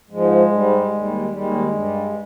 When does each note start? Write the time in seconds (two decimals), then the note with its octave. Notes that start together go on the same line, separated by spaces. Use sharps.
0.10 G#2 F3 G#3
0.50 G#2 G3
0.91 D#2 D#3 G3
1.31 D#2 D#3 G3 G#3
1.70 G2 G3